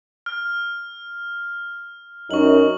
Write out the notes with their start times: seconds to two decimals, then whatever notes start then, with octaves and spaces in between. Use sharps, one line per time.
0.26 F6
2.31 F#2 D#4 C#6 F#7